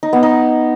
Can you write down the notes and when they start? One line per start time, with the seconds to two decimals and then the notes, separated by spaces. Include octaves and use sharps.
0.03 D#4
0.13 B3
0.23 D#4